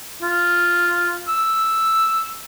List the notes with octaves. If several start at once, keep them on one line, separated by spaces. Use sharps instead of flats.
F4
E6